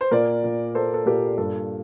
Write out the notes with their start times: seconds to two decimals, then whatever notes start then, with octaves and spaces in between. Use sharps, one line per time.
0.01 C5
0.11 A#2 A#4 D5
0.44 A#2
0.75 A#3 A4 C5
0.94 A4
1.06 A#2 G4 A#4
1.38 G2 A4